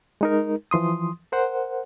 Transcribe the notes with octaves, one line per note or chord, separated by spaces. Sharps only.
G#3 D#4 A#4
E3 F3 C6 D#6
A#4 C5 F#5